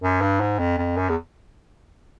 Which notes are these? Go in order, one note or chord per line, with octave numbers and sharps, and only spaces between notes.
F#2
G2
G#2
F2
F2
F#2
E2